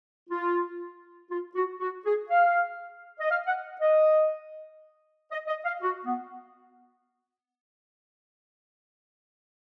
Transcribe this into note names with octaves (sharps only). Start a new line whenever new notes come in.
F4
F4
F#4
F#4
G#4
F5
D#5
F5
F#5
D#5
D#5
D#5
F5
F#4
B3